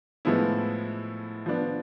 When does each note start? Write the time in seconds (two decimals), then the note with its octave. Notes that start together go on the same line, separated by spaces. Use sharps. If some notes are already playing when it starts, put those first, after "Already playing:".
0.25 A2 F3 G#3 B3 E4
1.46 F3 B3 D4